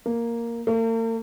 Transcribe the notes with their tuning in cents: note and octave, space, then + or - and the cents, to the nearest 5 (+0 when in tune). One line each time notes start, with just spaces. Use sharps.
A#3 +0
A#3 -45